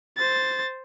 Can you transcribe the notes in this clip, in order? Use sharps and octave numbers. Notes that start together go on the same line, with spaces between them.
C5 A6